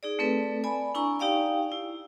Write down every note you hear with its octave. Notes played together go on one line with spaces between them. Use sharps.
D#4 G#4 D5
A3 C4 A4 B4 D5
D5 G#5 B5
D4 E4 G#5 A#5 C#6
D#4 G4 D5 F5 G5
E4